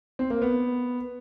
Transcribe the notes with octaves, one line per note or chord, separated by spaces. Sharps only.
C4
A#3
B3